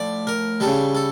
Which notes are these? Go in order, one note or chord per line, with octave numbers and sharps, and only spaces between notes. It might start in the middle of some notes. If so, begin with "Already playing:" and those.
Already playing: A2 F3 D5
A#4
C#3 G3 A4
A4